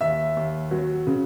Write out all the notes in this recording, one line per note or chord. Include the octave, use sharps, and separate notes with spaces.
D#2 E5
D#2
F#3
C#3